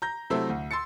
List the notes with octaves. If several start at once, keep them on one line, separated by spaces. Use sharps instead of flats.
A#5 G6 A#6
C3 F#3 A3 E4 A4 C5
D2
C6 E6 A6 C#7